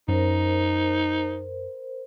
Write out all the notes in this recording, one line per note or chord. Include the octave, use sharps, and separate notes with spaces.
F#2 C#4 D#4 A#4 C5